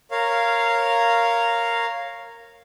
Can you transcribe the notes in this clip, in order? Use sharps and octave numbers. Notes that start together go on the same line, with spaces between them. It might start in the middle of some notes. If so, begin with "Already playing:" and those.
A#4 C#5 F5